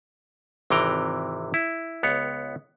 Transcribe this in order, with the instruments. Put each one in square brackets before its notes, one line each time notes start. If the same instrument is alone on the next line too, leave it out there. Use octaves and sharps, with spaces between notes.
[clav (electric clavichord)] G#1 C3 E3 G5 A#5
E4
C#2 B3 C#5